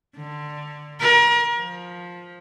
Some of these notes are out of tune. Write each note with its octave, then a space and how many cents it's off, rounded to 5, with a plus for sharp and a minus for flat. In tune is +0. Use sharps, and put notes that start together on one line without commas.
D3 +15
A#4 +35
F3 +15